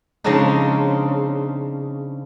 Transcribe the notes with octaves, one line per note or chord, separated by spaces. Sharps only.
C#3 F3 G#3 C4 D4 D#4